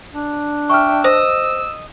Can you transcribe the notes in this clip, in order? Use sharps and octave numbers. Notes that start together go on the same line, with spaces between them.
D4
E5 G5 C#6 F6
C5 D#5 E6